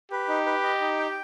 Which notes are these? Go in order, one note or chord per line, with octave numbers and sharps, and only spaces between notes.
G4 B4
D#4
B4
D#5
D#4
G5